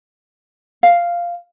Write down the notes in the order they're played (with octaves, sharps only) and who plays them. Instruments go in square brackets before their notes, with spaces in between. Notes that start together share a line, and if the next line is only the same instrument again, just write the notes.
[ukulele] F5